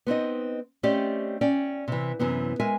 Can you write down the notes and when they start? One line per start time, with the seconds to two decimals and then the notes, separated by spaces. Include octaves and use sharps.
0.07 B3 C4 D#4 D#5
0.83 A3 C4 C#4 G4 D5 D#5
1.41 C#4 D5 G5
1.88 C3 E3
2.19 F#2 C3 E3 B3
2.60 G#3 A#4 E5 G#5